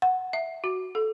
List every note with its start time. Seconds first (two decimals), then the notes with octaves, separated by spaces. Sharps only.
0.02 F#5
0.33 E5
0.64 F#4
0.95 A4